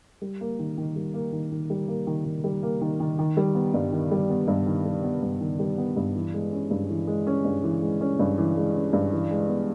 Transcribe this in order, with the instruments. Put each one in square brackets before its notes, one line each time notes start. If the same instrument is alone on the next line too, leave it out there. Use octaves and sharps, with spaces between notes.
[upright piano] G3
A#3
D#3
D#3
G3
A#3
D#3
D#3
G3
A#3
D#3
D#3
G3
A#3
D#3
D#3
D#3
G3
B3
G2
D#3
G3
B3
G2
D#3
G3
B3
G2
D#3
G3
B3
G2
E3
G#3
C#4
G2
E3
G#3
C#4
G2
E3
G#3
C#4
G2
E3
G#3
C#4
G2
E3
G#3
B3